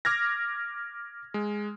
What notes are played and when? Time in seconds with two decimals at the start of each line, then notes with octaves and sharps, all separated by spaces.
0.05 D6 F6 G#6 A#6
1.34 G#3